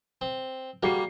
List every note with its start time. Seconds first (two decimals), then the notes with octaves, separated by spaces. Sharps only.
0.21 C4
0.83 G3 A#3 F#4 G#4 C7